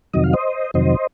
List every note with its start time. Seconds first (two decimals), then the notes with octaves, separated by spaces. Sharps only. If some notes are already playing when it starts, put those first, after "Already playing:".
0.14 F2 C3 D#3 F#3 D#5
0.24 F5
0.33 C5 D#5
0.74 F2 C3 D#3 F#3 C5 D#5